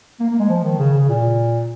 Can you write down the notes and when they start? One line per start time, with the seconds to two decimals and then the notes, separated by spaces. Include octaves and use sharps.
0.20 A#3
0.30 A#3
0.39 G#3
0.49 F3
0.63 D#3
0.79 C#3
0.94 C#3
1.09 A#2